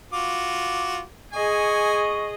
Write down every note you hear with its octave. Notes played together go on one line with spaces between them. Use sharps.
F4 F#4 D6
G#4 D#5 G#5 C#6